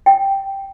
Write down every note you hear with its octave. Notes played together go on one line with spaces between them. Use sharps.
G5